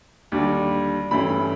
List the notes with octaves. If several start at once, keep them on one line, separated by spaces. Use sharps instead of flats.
D#2 D3 G3 D6
G2 E3 A3 C#4 B5